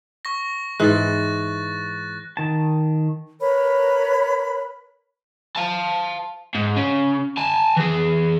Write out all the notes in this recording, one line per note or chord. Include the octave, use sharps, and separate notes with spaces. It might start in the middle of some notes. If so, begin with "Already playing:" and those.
C#6 A#6
G#2 E3 F#6 A6
D#3 A5
A#4 B4 C#5 B5
F5 A5
G#2
C#3
G#5 A5
E3 G#4